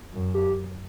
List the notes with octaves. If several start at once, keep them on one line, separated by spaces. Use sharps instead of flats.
F#2
G4